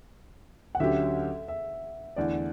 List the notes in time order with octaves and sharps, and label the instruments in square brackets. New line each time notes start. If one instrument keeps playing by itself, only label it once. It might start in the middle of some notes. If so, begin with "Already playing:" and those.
[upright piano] F#5
[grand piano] D2 D3 F#3 C#4 G4 [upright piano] E5
[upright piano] E5
[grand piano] E2 D3 A3 [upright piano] D5